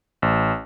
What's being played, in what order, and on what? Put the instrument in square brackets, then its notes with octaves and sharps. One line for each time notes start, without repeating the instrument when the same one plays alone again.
[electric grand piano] A1